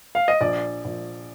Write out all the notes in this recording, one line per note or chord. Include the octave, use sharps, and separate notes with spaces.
F5
D#5
A#1 D5
A#1